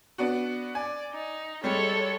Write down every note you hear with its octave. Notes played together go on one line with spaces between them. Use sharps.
B3 D4 F#4
D5 G#5
D#4
G3 G#3 A4 C#5